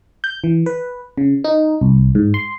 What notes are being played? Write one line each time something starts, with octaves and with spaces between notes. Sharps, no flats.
G6
E3
B4
C#3
D#4
C2
G#2
C6